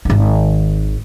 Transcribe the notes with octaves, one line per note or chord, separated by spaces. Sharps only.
G#1 D#3